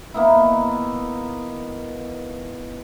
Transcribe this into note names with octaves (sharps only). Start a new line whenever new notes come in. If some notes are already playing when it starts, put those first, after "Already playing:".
D#3 A#3 B3 E4